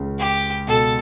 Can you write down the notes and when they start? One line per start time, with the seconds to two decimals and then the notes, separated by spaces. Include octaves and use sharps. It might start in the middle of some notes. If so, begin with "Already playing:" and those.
Already playing: C#2 C#3
0.19 G4
0.67 B2 A4